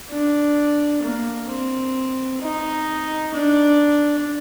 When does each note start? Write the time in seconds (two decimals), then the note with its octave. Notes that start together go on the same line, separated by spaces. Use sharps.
0.10 D4
1.03 A#3
1.49 C4
2.41 D#4
3.34 D4